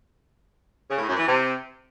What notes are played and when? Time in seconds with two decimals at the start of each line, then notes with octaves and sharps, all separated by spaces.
0.89 C#3
0.98 A2
1.07 F#2
1.16 E3
1.25 C3